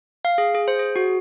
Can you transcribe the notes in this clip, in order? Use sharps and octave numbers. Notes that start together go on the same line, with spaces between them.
F5
G#4
G#4
C5
G#4
F#4